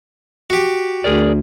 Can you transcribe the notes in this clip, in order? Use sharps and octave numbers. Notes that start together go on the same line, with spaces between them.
F#4 G4
D2 G#4 A#4 D5